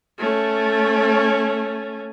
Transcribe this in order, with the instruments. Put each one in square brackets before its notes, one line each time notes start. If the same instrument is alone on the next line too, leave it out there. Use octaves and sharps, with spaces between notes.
[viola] A3 C#4